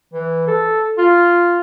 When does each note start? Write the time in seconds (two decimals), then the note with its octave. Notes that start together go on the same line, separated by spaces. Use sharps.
0.13 E3
0.47 A4
0.97 F4